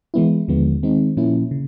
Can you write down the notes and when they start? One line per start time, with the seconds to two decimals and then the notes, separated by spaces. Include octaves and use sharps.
0.14 E3 G#3 B3 E4
0.48 D#2 D3 F3 G#3 B3
0.83 D#3 G#3 C4 D#4
1.17 A#2 F3 A#3 C#4 E4
1.51 C#3